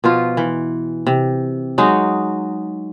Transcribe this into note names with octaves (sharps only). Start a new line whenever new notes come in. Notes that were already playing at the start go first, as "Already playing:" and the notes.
B2 F3 F4
E3
C3
F#3 G#3 D#4 F#4